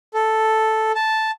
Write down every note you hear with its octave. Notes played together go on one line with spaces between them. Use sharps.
A4
A5